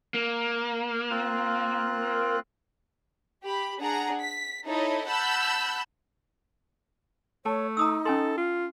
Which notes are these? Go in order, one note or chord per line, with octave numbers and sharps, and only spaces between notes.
A#3
C4 F4 F#6
G4 B5
D4 G#4 F#5 A#5
B6
D#4 E4 A4 C#5 D#5
F#5 A5 B5 E6 F#6 G6
A3 C#5 A5
D#4 A#5 D#6 E6
C#4 A4 G#5 C6
F4